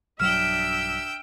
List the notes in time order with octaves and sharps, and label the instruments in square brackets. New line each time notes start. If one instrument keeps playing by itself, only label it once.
[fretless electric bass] B1 G2 F#3 [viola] D4 E5 [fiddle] G5 E6 [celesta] F6